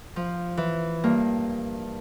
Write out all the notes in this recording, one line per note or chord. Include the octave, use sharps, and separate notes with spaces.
F3
E3
G2 A#3